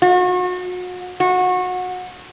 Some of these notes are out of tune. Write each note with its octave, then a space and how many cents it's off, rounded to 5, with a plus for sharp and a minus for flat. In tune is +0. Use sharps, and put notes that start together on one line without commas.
F#4 -35
F#4 -25